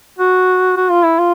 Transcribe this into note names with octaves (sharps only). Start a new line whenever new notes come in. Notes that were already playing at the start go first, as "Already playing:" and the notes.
F#4
F#4
F4
E4
F4